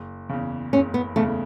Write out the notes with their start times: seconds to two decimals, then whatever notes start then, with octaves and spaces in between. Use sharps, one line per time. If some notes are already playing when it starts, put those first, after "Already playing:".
Already playing: F#1
0.29 E2 C#3
0.73 F#1 C#4
0.94 B3
1.16 E2 C#3 A3